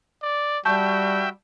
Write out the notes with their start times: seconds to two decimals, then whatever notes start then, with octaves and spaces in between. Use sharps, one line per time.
0.22 D5
0.65 G3 F#4 E5 G5 A5 C#6 G6